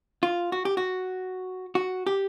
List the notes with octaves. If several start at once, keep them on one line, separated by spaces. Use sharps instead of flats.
F4
F#4
G4
F#4
F#4
G4